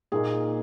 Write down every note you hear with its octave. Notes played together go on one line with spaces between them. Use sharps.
A#2 A#3 D#4 G#4